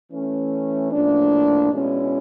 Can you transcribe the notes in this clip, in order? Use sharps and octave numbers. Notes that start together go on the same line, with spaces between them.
E3 A3 C#4
A2 F3 A#3 D4
B2 G#3 C#4 E4